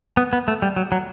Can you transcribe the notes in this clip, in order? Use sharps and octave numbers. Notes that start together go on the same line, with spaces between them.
B3
B3
A3
G3
F#3
F#3